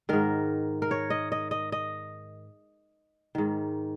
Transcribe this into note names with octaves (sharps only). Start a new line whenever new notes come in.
G#2 D#3 A#4
A#4
C#5
D#5
D#5
D#5
D#5
G#2 D#3